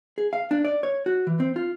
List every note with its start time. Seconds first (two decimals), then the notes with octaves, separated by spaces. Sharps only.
0.18 G#4
0.33 F5
0.51 D4
0.64 D5
0.83 C#5
1.06 F#4
1.27 E3
1.40 C4
1.56 F4